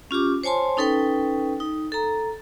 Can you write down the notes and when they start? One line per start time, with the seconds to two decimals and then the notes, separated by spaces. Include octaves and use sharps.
0.11 C#4 F4 G4 D6
0.44 C5 C#5 G#5 A5 C6
0.77 C#4 D#4 A4 B4 G5
1.60 D#4
1.92 A4 A#5